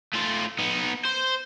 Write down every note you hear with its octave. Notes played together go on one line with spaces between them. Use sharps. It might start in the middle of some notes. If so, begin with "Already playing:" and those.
A3 F4
B3 D#4
C5